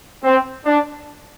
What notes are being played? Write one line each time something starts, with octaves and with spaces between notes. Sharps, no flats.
C4
D4